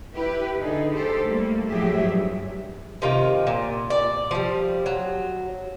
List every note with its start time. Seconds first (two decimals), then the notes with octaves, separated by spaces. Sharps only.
0.14 E4 G4 B4
0.59 D3 D#4 G#4
0.93 G4 A4 C5
1.25 G3 A3 A#3
1.68 A2 F3 F#3 G4 G#4 E5
2.05 G2
3.02 C3 D#3 F4
3.47 A#2
3.90 D5
4.31 F3 G3
4.86 F#3